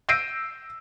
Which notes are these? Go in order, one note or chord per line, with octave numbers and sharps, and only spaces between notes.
E6 G6 A#6 C7 D7 D#7